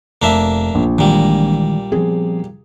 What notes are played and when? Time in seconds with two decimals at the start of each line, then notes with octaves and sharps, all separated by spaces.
0.22 F1 A#3 D4 E5
0.75 A#1
0.98 A#2 D#3 E3 G3 G#3
1.92 F3 B3 C4 G#4